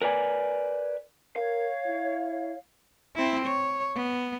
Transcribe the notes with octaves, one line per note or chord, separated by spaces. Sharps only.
A#4 B4 D5 G#5
A#4 C#5 F5
E4
C4 E4
C#5
B3